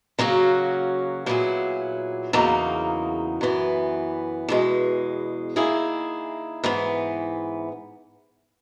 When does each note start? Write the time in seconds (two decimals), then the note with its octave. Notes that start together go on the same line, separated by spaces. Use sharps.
0.19 C#3 F#3 A#3 C#4 F#4
1.26 A#2 F#3 B3 E4 G#4
2.33 E2 C#3 F#3 A#3 D#4
3.41 F#2 E3 B3
4.49 E2 B2 G#3
5.56 D#3 A#3 E4 G#4
6.64 G#2 E3 B3